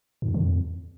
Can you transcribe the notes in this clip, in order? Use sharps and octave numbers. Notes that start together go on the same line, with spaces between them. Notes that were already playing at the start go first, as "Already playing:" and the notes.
G2
F2
D3
F2